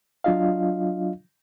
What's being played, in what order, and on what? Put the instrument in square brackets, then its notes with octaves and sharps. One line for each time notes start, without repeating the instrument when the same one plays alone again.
[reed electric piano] F#3 D4 F4 D#5 F5